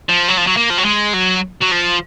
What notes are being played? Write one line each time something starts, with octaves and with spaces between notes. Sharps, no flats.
F3
F#3
F3
F#3
A#3
F3
F#3
G#3
F#3
F#3
F3